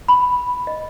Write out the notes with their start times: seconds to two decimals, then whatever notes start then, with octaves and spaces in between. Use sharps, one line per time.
0.08 B5
0.67 D#5